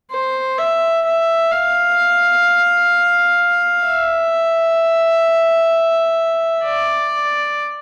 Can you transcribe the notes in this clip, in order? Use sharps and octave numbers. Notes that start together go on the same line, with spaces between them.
C5
E5
E5
F5
E5
D5